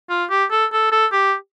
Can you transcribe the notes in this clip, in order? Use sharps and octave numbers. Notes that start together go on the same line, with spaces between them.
F4
G4
A4
A4
A4
G4